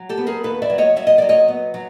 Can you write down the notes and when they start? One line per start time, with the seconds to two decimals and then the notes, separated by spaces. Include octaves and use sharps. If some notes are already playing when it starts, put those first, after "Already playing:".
Already playing: F#3
0.09 G4 A4
0.17 B3
0.26 G#4 A#4
0.43 D#2 A4 B4
0.62 D5 E5
0.70 F#3
0.78 C#5 D#5
0.96 F#3 E5
1.07 D#5
1.18 F#3 D5
1.29 C#5 D#5
1.48 B3
1.74 F#3